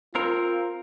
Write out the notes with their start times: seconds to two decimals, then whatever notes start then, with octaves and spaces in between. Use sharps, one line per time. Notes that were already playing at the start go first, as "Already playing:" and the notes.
0.15 C4 F4 A#4